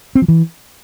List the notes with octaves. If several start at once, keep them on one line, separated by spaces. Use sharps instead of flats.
C4
F3
E3